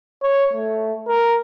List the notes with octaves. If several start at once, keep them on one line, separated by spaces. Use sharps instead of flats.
C#5
A3
A#4